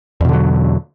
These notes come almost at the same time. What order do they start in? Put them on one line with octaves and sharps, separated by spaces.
E2 B2 D3 F#3